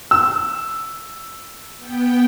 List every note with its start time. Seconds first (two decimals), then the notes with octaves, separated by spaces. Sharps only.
0.11 E6
1.78 B3 G5